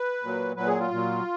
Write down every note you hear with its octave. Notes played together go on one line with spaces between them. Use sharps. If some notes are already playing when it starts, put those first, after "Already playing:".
Already playing: B4
A#2 F#3
A#2 F#3 B4
G#4
F4
A#2 F#3